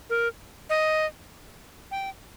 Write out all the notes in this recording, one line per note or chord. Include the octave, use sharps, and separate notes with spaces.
A#4
D#5
G5